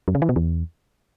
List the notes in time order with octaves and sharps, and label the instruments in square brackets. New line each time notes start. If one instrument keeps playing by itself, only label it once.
[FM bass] F#2
C#3
E3
B2
E2